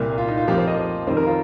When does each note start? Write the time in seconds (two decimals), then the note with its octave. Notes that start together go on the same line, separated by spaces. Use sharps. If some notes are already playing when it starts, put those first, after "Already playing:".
Already playing: C2 A#2 A#3
0.18 F4
0.28 D#4
0.38 F4
0.48 F2 F3 A#3 G4
0.58 C5
0.67 D#5
1.07 F2 D#3 G3 C5
1.17 A#4
1.27 F4